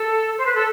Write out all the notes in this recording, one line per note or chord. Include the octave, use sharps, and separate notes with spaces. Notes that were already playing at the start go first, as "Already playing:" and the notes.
Already playing: A4
C5
B4
A4